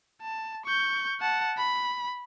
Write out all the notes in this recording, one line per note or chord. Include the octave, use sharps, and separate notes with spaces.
A5
C#6 G6
F#5 A5
B5